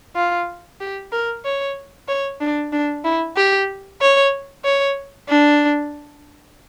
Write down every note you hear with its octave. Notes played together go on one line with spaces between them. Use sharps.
F4
G4
A#4
C#5
C#5
D4
D4
E4
G4
C#5
C#5
D4